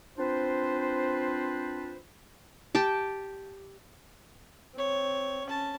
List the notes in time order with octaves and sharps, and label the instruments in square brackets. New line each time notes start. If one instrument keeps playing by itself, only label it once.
[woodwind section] C4 D4 F4 B4 C5
[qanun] G4 G5 A5
[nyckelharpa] C4 C#5
C#4 A5